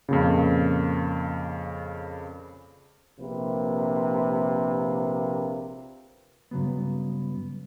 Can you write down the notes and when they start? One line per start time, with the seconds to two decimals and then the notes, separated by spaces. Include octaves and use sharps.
0.09 F2 A#2 C#3
3.19 A#1 C3 A#3 B4
6.51 G2 C#3 F#3 B3